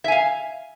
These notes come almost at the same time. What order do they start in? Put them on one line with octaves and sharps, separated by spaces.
E5 G#5 F5